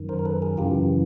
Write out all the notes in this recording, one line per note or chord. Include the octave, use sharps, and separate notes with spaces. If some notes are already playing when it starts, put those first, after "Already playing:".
Already playing: F#2 D#3
A#4 C5
A#4
A4 B4
G#4 A#4
F#2 C#3 E3 F4 G4